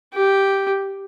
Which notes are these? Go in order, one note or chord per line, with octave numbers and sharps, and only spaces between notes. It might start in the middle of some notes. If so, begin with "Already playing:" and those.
G4